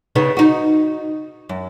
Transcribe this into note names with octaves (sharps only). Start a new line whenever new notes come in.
C#3 B3 D#4
D#4 F#4
F#2